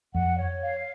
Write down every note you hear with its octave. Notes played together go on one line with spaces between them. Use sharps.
F2 F#5
C#5
F5